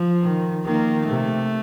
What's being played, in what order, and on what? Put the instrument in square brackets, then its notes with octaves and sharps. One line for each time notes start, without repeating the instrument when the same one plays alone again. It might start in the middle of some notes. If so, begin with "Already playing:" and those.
Already playing: [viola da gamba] F3
[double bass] D#3
[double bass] D#3 [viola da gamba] A#3
[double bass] C3 [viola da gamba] A3